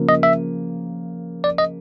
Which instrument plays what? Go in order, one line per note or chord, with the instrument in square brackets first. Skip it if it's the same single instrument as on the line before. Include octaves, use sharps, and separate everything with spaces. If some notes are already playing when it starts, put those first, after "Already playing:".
Already playing: [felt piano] C#3 F3 A#3
[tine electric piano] D#5
E5
D5
D#5